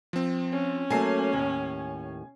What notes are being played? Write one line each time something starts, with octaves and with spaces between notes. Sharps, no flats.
F3 C4
C#4
F#3 A3 A#3 G#5 C7
D#2 A2